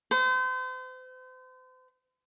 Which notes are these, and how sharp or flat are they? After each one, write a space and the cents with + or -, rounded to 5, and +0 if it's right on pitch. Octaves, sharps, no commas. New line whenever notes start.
C5 -40